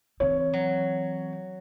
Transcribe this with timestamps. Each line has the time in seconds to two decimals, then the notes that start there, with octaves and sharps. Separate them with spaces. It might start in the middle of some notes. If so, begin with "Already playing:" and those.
0.20 E3 C4 C#5
0.53 F#3